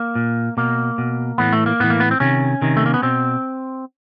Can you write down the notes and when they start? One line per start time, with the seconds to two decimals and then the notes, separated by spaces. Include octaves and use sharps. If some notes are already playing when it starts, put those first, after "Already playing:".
Already playing: A#3
0.15 A#2
0.57 B2 A#3
0.98 B2
1.38 A2 E3 B3
1.53 A3
1.66 A#3
1.80 A2 E3 B3
1.90 A#3
2.00 B3
2.11 C4
2.20 C3 D#3 C#4
2.62 C3 D#3
2.77 A3
2.86 A#3
2.94 B3
3.03 B2 C4